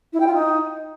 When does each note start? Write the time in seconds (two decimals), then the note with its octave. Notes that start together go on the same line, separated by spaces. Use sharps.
0.13 E4
0.19 G5
0.26 F4
0.33 D#4